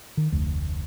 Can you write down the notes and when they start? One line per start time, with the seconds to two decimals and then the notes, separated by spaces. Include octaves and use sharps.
0.17 D#3
0.32 F1 D2